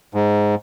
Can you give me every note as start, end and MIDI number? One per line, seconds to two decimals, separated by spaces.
0.14 0.55 44